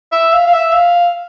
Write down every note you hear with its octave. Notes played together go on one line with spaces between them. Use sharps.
E5
F5
F5
E5
F5